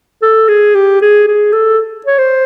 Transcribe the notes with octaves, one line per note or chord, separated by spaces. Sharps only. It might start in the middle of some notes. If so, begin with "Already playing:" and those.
A4
G#4
G4
G#4
G#4
A4
C#5
C5